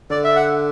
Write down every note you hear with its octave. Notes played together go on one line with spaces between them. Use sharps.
D3 D5
E5
F#5